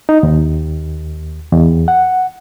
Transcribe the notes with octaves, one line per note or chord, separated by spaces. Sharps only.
D#4
D#2
E2
F#5